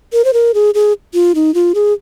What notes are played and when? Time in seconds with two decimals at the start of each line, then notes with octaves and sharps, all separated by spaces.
0.13 A#4
0.25 C5
0.33 A#4
0.54 G#4
0.75 G#4
1.14 F4
1.35 D#4
1.54 F4
1.75 G#4